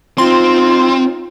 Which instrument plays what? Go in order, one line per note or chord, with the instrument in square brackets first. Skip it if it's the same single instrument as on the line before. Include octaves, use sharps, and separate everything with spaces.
[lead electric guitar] C4 [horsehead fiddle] D#4 F4 [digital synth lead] C6